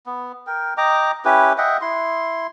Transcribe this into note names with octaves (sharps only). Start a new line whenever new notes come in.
B3
A#4 G5
D#5 G5 A#5 D6
C#4 E4 G4 B4
D#5 E5 F#5 G5
E4 C6